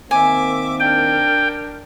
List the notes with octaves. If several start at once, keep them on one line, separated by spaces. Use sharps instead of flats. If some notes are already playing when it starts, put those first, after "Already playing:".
D#3 A#3 C4 E5 G#5 D6
D4 A#4 G5